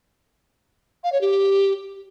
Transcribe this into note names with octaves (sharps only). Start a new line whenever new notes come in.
F5
C#5
G4